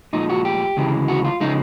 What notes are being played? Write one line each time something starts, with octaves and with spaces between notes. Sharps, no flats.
A#2 F3 G#3 D#4
F#4
G4
D2 C#3 E3 G#3
F#4
F4
C#3 F3 G#3 D#4